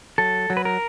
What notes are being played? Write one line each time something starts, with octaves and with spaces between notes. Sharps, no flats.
F#3 A4
F#3
B4
A#4